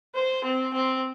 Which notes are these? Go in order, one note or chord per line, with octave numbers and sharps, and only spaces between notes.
C5
C4
C4